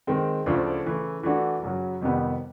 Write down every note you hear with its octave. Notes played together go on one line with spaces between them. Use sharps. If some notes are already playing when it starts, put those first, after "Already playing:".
D#3 G#3 C4
D2 C#3 F3 A3 D4
C#3 E3 A3
E3 A3 D4 F#4
F#2 C#3 F#3
F2 C3 D#3 G3 B3